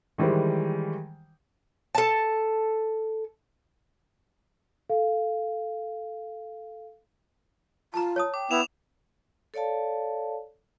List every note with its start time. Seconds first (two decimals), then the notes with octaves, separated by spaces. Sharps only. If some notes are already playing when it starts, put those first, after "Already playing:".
0.18 D#3 E3 G3 G#3 C5
1.95 A4 A5
4.90 A4 F5
7.94 F4 A5 A#5
8.16 C#5 A5 D#6
8.34 G5 D6
8.51 B3 E4 E7 F7
9.54 A4 C#5 D5 F5 A5